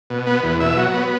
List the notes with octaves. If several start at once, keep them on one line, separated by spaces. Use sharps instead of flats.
B2
B3
E2
B2 E5
F#3
B3